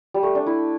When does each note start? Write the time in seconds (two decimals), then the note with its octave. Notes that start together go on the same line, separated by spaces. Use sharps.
0.14 G3
0.23 A3
0.35 D4
0.46 E4